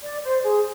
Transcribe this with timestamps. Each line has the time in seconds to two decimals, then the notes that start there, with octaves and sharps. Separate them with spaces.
0.03 D5
0.24 C5
0.45 G#4